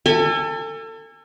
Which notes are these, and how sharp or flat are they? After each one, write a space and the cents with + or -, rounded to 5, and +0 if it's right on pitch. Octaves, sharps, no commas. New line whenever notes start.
A4 +30 G#5 -25